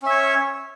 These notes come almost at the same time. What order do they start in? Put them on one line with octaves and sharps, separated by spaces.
C#4 E5 C#5